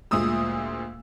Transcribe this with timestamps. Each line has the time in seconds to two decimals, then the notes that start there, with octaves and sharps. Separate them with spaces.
0.11 D2 A#2 G#3 D#6 E6